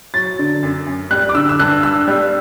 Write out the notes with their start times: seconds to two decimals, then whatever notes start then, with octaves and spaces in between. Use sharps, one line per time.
0.14 F#3 A6
0.39 D3
0.63 F#2
0.87 F#2
1.11 G3 F#6
1.29 D6
1.35 D3 E6
1.49 E6
1.59 G2 F#6
1.83 G2 E6
2.07 G3